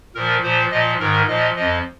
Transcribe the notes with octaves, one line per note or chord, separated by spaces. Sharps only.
A#2 F3 A#4
A#2 F3 C5
A#2 F3 D#5
G#2 D#3 A#4
A#2 F3 D#5
F2 F3 D#5